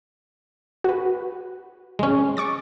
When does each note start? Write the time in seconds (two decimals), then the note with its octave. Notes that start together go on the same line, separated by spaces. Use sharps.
0.84 F#4 B4
1.99 G#3 C#4
2.37 C#6 D6 A6